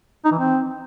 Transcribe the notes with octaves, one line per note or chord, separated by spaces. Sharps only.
D#4
E3
C4